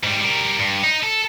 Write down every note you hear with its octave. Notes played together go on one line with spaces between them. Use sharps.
G#2 G3
G3 A#4
G2
D#4
A4